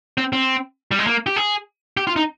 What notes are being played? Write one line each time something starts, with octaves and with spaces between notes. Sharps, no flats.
C4
C4
G3
G#3
A#3
G4
G#4
G4
F4
D#4